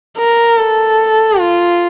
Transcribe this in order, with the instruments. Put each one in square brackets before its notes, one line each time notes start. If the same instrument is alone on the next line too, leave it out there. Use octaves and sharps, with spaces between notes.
[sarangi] A#4
A4
F4